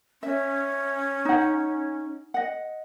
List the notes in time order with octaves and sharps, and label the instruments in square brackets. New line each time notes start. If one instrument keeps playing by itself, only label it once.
[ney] C#4 [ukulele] E5
[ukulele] D#4 F#5
D#5 F#5